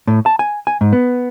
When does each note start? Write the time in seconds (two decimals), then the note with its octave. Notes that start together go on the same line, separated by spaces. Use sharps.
0.07 A2
0.26 A5
0.39 G#5
0.67 G#5
0.81 G#2
0.93 B3